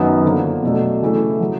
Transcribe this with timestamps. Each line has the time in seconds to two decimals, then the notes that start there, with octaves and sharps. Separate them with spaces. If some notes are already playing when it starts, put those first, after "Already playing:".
Already playing: F#2 D#3 F#3 B3
0.25 D3 F3 A#3 D4
0.63 B2 F#3 A3 D4
1.02 C#3 E3 A3
1.40 C#3 F#3